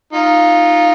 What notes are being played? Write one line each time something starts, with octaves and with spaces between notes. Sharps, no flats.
D#4 F4